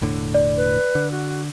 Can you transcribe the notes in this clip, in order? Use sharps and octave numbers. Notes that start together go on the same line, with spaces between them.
E1 A2 D3
D5
B4
D3
F#4